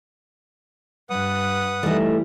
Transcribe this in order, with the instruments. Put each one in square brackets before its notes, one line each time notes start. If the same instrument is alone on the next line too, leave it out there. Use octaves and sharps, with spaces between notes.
[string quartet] G2 [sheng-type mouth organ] B4 F#5 D#6
[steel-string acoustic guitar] E3 G3 [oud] A3 D#4